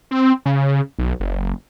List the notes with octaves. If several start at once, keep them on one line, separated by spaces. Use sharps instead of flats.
C4
C#3
B1
F#1